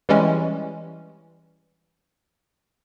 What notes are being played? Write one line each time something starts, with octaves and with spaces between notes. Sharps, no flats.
E3 G3 G#3 C#4